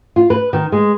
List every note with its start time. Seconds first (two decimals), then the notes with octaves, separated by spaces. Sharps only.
0.16 F4
0.30 B4
0.53 D#3
0.72 G#3